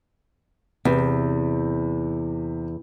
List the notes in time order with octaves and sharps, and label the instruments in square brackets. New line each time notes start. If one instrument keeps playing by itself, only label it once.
[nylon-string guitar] E2 [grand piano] C3